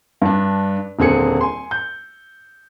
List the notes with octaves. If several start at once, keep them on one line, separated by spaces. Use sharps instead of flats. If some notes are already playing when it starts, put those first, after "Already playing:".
G2 D4
D#1 D3 C4 G#4 C#7
G#5 C6
G6